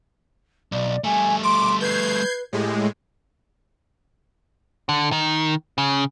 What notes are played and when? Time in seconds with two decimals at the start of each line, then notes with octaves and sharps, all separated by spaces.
0.72 B1 D5
1.04 G3 A3 G#5
1.43 C6 D6
1.81 B4 G6 G#6 C7
2.53 A2 G#3 G4
4.89 D3
5.12 D#3
5.78 C#3